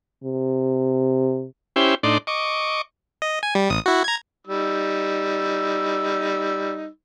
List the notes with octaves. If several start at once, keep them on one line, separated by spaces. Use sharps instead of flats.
C3
C#4 E4 G4 C5
A2 D4 D#4 D5 C6
D#5 C#6 D6
D#5
G#5
G3
A1 D#6
E4 F#4
A#5 G#6
G3 D#4 E6